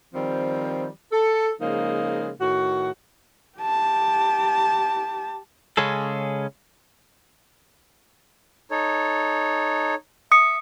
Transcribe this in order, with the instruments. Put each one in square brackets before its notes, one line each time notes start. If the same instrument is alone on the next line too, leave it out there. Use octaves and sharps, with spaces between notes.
[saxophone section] D#3 F3 G3 C4
A4
C#3 F3 G#3 A#3 D#4
A2 D#3 F#4
[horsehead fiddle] G4 A5
[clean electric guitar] C#3 G#3 C#4 G#4 A4
[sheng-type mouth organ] D#4 A4 C#5
[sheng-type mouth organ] E5 [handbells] D#6 C#7